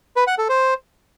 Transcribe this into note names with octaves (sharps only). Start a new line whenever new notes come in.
B4
F#5
A4
C5